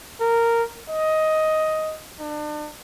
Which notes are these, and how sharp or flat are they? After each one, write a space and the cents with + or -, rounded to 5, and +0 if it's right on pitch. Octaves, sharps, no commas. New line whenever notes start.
A#4 -10
D#5 +10
D4 +35